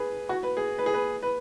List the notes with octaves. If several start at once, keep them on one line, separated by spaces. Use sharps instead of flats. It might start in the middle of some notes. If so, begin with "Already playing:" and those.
Already playing: G#4 B4
F#4
B4
G#4
B4
G#4
B4
B4